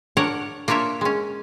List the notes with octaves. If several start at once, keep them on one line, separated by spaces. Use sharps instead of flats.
D4 A#4 C#5 F#5
A#3 D4 F4 C#5 E5
G#3 C#4